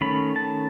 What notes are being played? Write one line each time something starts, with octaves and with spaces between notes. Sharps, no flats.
D#3 A3 C#4 B5
A5